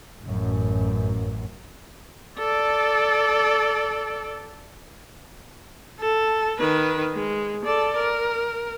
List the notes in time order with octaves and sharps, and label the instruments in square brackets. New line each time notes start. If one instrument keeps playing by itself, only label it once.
[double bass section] A1 F#2
[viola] A4 D5
A4
D#3 B4
G#3
A4 D5
A#4